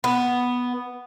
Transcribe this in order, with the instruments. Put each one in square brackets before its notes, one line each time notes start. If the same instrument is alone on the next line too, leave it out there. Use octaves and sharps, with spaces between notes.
[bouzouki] B3